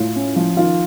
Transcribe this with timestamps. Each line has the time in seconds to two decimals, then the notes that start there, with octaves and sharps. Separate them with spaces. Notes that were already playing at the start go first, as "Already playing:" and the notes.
Already playing: A2 F4
0.16 C#4
0.36 F3
0.57 D#3 F4